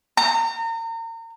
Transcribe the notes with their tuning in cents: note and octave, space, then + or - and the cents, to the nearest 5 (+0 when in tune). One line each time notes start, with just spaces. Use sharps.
A#5 -35